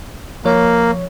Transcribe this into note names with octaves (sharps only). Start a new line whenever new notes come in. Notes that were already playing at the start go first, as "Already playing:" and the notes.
F3 A#3 C#5